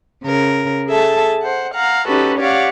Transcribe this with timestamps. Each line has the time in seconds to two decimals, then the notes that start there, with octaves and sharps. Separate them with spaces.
0.23 C#3 A#4
0.87 G#4 A4 E5 A5
1.43 C5 F#5
1.74 F5 F#5 A#5
2.07 C#4 D#4 F#4 G4 A4 B4
2.38 G4 C#5 D5 F5 F#5